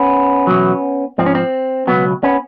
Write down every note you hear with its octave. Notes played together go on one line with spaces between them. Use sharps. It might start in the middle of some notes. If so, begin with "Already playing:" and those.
Already playing: B3 C#4
E2 B2 F#3
G#2 F3 C4
C#4
C4
C#2 B2 F#3 B3
B3 C#4